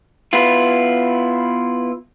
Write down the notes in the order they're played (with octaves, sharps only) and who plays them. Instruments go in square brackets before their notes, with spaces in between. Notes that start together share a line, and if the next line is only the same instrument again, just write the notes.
[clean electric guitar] B3 E4 F4